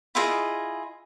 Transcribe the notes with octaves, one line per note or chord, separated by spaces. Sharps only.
E4 F4 G#4 D#5